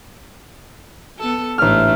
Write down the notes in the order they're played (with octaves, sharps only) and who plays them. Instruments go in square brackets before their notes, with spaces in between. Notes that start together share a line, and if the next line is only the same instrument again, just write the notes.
[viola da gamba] B3 A4
[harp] A1 F6 [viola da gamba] G#2 A3 D4